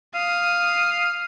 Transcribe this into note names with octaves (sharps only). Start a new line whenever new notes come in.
F5 D#6